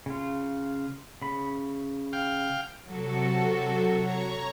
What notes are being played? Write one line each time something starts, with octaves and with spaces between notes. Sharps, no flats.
C#3 F4
C#3 B5
F5 G5
C3 F#3 F#4 A4
C#5 A#5 C#6